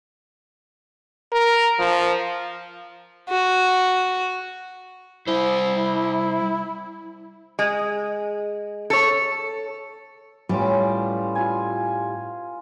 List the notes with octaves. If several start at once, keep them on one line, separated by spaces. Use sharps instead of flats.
A#4
F3
F#4
G3 E4 C5
G#3
A4 C#5
A2 E3 G3 C#4 F4 D5
F4 G#5